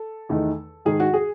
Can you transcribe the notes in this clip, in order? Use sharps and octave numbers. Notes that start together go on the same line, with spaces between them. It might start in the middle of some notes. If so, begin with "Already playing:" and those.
Already playing: A4
E2 D#3 A3 D#4
G#2 D#3 G#3 G#4
F#4
G#4